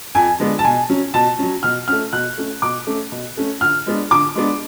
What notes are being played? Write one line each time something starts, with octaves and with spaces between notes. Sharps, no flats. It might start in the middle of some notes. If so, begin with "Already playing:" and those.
F2 G#5
D3 G#3 B3 D4
A5
B2 G#5
F#3 C#4
B2 A5
F#3 C#4
B2 F6
A3 C#4 F6
B2 F#6
A3 C#4
B2 D6
A3 C#4
B2
A3 C#4
D3 F6
G#3 B3 D4
D3 D6
G#3 B3 D4